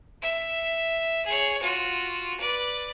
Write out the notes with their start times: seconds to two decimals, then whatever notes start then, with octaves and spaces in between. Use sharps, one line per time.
0.22 E5
1.26 G#4 C#5
1.61 F4 F#4
2.40 B4 D5